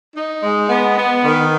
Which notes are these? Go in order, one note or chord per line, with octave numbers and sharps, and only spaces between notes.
D#4
G#3
B3
B3
D#3